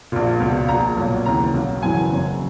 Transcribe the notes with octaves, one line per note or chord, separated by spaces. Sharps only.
A#1 A#2
C#2 B2
A#1 A#2 A#5
B1 A#2
D#2 C#3 E3 A#5
B1 B2
G#1 F#2 C#3 E3 G#5
F#1 F#2 C#3